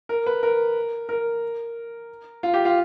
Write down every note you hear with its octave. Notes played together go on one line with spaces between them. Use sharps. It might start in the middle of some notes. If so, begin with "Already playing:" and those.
A#4
B4
A#4
A#4
F4
G4
F4